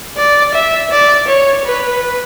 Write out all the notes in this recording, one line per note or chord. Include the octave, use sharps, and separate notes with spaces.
D5
E5
D5
C#5
B4